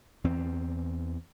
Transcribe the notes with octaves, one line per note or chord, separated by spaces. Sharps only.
E2 C4